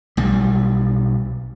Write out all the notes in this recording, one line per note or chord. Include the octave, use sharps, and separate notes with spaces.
B1 G3